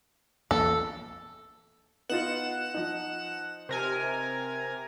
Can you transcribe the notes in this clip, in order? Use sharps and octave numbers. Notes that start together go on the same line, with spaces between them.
A#1 E2 A#3 A4
B3 D#4 F4 F#5 E7
F3 D#4
C3 A#4 G#5